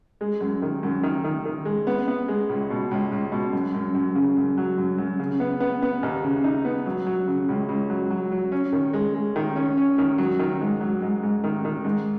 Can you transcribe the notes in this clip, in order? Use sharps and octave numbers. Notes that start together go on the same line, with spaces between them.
G#3
F#2
D#3
F#2
D#3
D#3
D#3
G#3
B3
B3
G#3
C#2
B2
C#2
C#2
B2
F#2
F#2
F#2
C#3
F#2
F#3
F#2
F#2
C#3
B3
B3
B3
D#2
C#3
D#4
B3
F#3
F#3
C#3
C#2
C#2
F#3
F#3
F#3
C#4
D#3
G#3
G#3
D#3
C#4
C#4
D#3
F#3
D#3
G#2
F#3
G#2
G#2
D#3
D#3
G#2